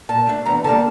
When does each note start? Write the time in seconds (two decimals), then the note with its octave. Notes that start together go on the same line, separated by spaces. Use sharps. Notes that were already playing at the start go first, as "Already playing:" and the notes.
0.09 A#2 A5
0.27 A3 D4
0.45 E2 A#5
0.64 D3 G3 A#3 A5